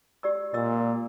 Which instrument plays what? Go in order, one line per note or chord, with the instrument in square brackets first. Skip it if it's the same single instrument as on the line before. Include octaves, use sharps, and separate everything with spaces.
[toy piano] G4 D5 E6
[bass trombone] A#2 [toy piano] D#5 E6